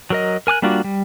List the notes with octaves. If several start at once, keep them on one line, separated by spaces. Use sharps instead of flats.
F#3 A#4 D#5
A#4 G#5 D6 F#6
G3 A#3 D4 F4 F#4
G3